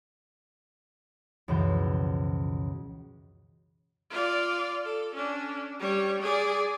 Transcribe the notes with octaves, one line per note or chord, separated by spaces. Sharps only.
C#2 F#2 B2 E3 F3 G6
F4 D5
A4
C#4 D4
G3 C#5
G#4 D5